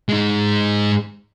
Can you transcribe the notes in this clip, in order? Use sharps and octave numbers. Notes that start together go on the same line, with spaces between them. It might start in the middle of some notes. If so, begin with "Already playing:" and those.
G#3 D#4